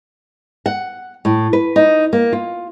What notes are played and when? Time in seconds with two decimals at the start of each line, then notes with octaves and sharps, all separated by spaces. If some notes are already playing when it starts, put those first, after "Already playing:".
0.66 F#5
1.25 A2
1.53 B4
1.76 D#4
2.13 A#3
2.33 F4